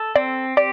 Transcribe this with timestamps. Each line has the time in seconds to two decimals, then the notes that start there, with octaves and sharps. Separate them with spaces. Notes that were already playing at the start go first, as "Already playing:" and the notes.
Already playing: A4
0.15 C4 D5
0.57 G4 D5